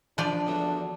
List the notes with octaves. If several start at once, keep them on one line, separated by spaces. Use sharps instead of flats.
F3 D4 F4 G#4 D5 B5
E2 D3 F#3